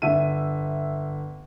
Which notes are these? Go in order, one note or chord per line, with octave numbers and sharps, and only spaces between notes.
G1 E5 D#7